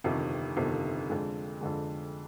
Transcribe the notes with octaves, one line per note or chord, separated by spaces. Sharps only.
G1 F2 C3 D#3
G1 F2 C3 D#3
F2 D3 G#3
F2 D3 G#3